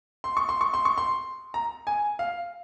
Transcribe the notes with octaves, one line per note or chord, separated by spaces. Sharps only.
C6
C#6
C6
C#6
C6
C#6
C6
A#5
G#5
F5